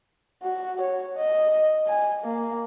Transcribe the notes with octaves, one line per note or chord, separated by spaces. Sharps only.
F#4
C#5
D#5
G#5
A#3